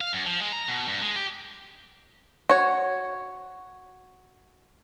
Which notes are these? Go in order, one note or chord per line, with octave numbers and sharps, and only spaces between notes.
F5
F#2
F3
G#3
A#5
B2
G2
G#3
G4
F#4 C#5